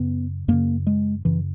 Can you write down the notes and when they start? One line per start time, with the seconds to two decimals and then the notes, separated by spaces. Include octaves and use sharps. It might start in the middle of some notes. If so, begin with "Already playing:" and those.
Already playing: F#2 C#3 B3
0.48 F#2 C#3 A#3
0.87 G#3
1.25 F#2 C#3 E3